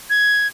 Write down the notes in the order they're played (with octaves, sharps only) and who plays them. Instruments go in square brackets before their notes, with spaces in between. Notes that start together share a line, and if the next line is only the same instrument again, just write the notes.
[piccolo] G#6